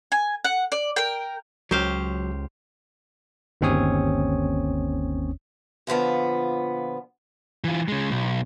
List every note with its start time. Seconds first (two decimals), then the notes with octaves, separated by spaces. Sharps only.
0.12 G#5
0.45 F#5
0.72 D5
0.96 A#4 G5
1.71 C#2 F#3 G4 C5 F5
3.61 G1 D#2 C4 C#4 C#5 D#6
5.87 A#2 D3 F3 B3
7.64 E3 F4
7.88 C#3 G#3
8.11 B1